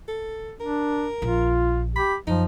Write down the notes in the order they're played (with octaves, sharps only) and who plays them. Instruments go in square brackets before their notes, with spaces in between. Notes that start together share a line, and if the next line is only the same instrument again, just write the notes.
[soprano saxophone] A4
[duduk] D4 [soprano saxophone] A#4
[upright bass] A#1 [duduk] F4
[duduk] G4 [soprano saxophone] B5
[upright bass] F#2 [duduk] F3 [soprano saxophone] D#4